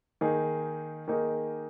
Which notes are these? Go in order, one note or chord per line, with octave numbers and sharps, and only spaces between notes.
D#3 A#3 D#4 G#4
D#3 A#3 D#4 G#4